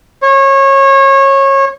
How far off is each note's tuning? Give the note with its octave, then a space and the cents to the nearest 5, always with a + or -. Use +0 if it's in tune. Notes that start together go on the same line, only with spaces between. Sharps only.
C#5 -25